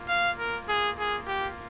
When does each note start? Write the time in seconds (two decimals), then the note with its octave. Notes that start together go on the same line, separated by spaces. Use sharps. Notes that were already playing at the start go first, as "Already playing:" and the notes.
Already playing: A#3 F4
0.08 F5
0.38 A#4
0.68 G#4
0.98 G#4
1.27 G4